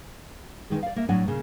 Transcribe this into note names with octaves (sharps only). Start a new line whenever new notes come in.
E2 A2 D#3 G#3
D5 F5
A#3 E5
A2 F#3 D4 F#5 G#5
A#2 C#3